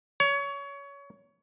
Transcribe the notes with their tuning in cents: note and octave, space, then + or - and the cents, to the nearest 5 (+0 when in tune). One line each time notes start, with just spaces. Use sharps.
C#5 +25